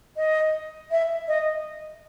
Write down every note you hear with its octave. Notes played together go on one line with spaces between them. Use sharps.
D#5
E5
D#5